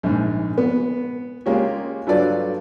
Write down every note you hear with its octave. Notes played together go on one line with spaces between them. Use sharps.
A#1 G#2
B3
G#3 A#3 C#4 F4 G4
G2 F#3 F4 A4 B4 D5